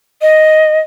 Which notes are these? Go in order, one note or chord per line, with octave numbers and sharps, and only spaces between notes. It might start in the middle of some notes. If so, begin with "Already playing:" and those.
D#5